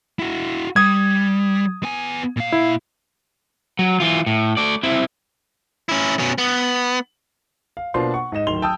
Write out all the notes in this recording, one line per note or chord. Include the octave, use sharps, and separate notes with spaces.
E4 F#4
G3 D#6 G#6
B3 G#5
A#2 F5
E4
F#3
E3 F4
A2
A3 D5
C4 E4
C#4 E4
B2 C#4
B3
F5
B2 A#3 D4 F4 C5 C6
F#5 C#6
G#2 D#4 D#5 E7
D1 D#3 C6 F7 G7
G5 A5 D#6 E6 G6